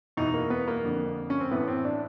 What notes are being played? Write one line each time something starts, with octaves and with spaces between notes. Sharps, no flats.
E2 B2 D#4
A#3
B3
A#3
F2 D3
C#4
C4
A2 E3 B3
C4
D4